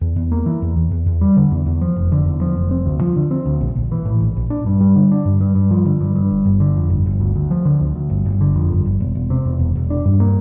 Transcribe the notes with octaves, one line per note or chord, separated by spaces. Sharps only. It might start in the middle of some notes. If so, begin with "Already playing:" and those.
E2
E2
A#3
E3
E2
E2
E2
E2
G3
D3
E2
E2
F3
F1
D3
E2
F3
F1
C4
D2
F3
D3
C4
D2
A#1
A#1
E3
A2
A#1
A#1
D4
G2
G3
D3
D4
G2
G2
G2
F3
D3
G2
G2
G1
G1
D3
F2
G1
G1
D2
D2
F3
D3
D2
D2
G1
G1
D3
F2
G1
G1
E1
E1
C3
E2
E1
E1
D4
G2
A#3